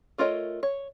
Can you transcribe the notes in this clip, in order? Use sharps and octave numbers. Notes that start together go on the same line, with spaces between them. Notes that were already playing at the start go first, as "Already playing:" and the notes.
A3 F4 A#4 C#5 D#5
C#5